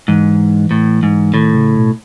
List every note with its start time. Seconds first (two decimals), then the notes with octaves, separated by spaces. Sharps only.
0.08 G#2 E3
0.71 A2
1.03 G#2
1.34 A2 D#3
1.55 C#3
1.77 B2